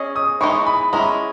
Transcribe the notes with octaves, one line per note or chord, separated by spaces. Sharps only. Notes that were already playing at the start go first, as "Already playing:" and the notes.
Already playing: C#4 G#4 D#5
D#6
E3 G#3 D#4 C#6
B5
G#3 C#4 E4 A#5